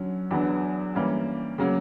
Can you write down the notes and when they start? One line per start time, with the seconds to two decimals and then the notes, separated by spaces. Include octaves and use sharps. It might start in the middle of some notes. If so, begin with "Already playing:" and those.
Already playing: D3 F#3 C#4
0.31 E2 D3 F#3 B3 D4
0.95 E3 G3 A#3 C#4
1.58 C#3 F#3 A#3